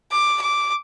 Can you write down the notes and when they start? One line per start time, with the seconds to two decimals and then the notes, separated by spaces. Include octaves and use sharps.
0.12 D6
0.41 D6